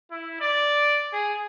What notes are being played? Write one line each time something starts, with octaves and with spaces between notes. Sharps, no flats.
E4
D5
G#4